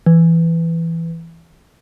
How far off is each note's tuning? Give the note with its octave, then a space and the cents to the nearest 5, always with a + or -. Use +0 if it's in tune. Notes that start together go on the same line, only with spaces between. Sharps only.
E3 +10